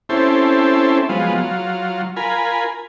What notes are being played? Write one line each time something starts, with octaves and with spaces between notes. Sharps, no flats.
C4 C#4 E4 G4 A4 C5
F3 F#3 G#3 B3 F4
F#3 F4
F4 A#4 G#5 B5